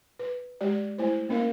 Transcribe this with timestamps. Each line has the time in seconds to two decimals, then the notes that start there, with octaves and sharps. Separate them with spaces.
0.19 B4
0.61 G#3 G4 D5
0.98 A3 E4 C5
1.29 A#3 C#4 A#4 F5